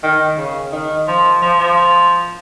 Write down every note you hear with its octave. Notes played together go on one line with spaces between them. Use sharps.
D#3
C#3
D#3
F3
F3
F3